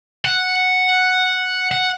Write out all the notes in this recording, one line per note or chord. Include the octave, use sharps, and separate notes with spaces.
F#5
F#5